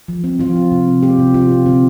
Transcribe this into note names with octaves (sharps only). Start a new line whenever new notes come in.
F3
C4
F3 F4
C4
C3
C4
C4 G4
C3
C3 F4
C3
D3 C4